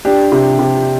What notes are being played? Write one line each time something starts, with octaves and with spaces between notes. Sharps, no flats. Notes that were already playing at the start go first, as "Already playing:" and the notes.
D4 G4
C3
C3